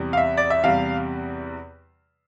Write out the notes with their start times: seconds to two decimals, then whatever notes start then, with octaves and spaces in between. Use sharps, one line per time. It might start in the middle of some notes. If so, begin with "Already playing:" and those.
Already playing: E2 C3 G3
0.13 F5
0.17 E5
0.37 D5
0.50 E5
0.64 E2 C3 G3 F5